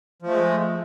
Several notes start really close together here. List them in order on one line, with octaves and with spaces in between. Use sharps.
F3 A3 G#3